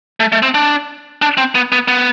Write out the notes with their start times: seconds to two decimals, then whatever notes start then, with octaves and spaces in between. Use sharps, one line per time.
0.20 A3
0.32 A3
0.43 C4
0.54 D4
1.22 D4
1.38 C4
1.55 B3
1.72 B3
1.88 B3